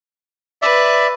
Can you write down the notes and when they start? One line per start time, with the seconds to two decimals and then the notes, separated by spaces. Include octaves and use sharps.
0.62 B4 D5 E5